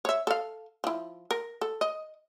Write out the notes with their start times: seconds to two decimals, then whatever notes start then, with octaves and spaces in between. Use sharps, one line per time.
0.05 C#5 E5
0.27 A4 F5
0.84 F3 E4
1.31 A#4
1.61 A4
1.81 D#5